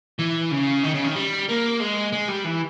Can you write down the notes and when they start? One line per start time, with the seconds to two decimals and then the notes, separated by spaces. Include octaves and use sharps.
0.19 E3
0.52 C#3
0.84 D#3
0.94 C#3
1.04 D#3
1.15 G3
1.49 A#3
1.80 G#3
2.13 G#3
2.29 G3
2.45 E3